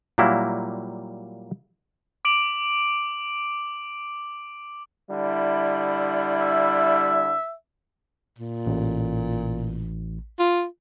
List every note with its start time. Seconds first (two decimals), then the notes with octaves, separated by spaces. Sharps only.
0.18 A#2 F#3 G3 A#3 E4
2.25 D6 D7 F#7
5.11 D3 G3 E4
6.40 E5
8.38 A#2
8.66 A1
10.39 F4